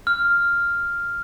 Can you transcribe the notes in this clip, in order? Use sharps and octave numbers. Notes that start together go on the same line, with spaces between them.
F6